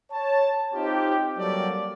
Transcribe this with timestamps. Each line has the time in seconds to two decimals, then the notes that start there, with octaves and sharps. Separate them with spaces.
0.12 C#5 A5
0.74 C4 D#4 F4 G4
1.38 F#3 G3 A#3 F#4 A4 D5